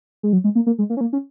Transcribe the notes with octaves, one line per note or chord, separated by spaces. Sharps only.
G#3
F#3
G#3
A#3
A#3
G#3
A#3
C#4
A#3
C#4